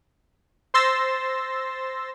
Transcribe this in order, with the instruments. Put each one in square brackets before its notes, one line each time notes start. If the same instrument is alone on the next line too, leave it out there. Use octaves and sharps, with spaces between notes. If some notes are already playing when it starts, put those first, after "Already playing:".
[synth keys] C5 C6 E6 A6 A#6